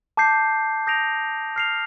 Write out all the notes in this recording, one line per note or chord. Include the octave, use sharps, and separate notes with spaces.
A5 D6 G6 C7
D#6 G6 A#6 D7 F7
F6 C7 F7